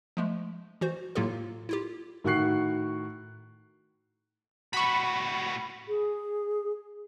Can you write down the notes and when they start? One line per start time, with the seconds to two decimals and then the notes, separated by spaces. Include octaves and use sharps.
0.17 F3 G#3 A3
0.81 E3 F#4 C5
1.15 A2 F#3 A#3 F4 G4 A4
1.69 E4 F4 G4
2.24 A2 D#3 F#4 C#6 F#6 C7
4.73 A2 F#4 B5 C#6
5.88 G#4